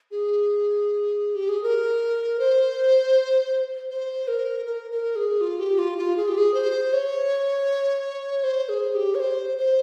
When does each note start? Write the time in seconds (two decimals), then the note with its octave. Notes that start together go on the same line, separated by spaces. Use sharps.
0.11 G#4
1.35 G4
1.49 G#4
1.63 A#4
2.39 C5
3.90 C5
4.28 A#4
4.66 A#4
4.91 A#4
5.16 G#4
5.41 F4
5.60 G4
5.79 F4
5.98 F4
6.17 G#4
6.28 G4
6.38 G#4
6.54 C5
6.93 C#5
8.44 C5
8.69 G#4
8.95 G4
9.15 C#5
9.20 C5
9.58 C5